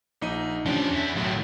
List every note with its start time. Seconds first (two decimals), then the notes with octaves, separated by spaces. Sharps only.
0.22 A#1 D#4 D#7
0.66 F3 C#4 D4 G4
0.91 E2 E4
1.16 B1 A2 D#3 F#3 F#4